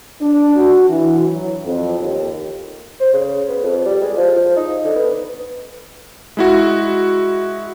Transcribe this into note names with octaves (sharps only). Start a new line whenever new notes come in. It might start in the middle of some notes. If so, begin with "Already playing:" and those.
D4
F#4
E3
F#3
F2
D#2
C5
C#3
B3
F2
G3
G#3
F3
F3
D#4
D3
B3
G#3 E4 F#4